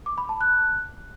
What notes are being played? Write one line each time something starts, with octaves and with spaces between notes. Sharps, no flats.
D6
B5
A5
F#6